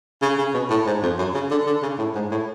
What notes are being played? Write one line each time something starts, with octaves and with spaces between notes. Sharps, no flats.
C#3
C#3
B2
A2
G#2
F2
F#2
C#3
D3
D3
C#3
A2
G#2
A2